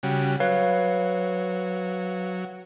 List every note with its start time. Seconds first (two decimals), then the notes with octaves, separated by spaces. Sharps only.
0.03 C#3 G3 F#4
0.40 F#3 B4 C#5 F5